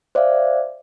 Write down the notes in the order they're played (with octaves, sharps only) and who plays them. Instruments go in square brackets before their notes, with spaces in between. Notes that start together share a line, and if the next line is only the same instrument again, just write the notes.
[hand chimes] C5 D5 E5 F5